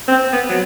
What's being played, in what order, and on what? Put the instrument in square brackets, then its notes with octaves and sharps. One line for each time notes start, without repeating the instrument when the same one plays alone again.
[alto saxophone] C4
B3
F#3